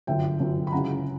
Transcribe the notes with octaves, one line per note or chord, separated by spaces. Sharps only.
G1 F#2 D3 E5 G5
G1 F#2 D3
B5
C#2 C#3 F#3 C#4 E4 F#5 A#5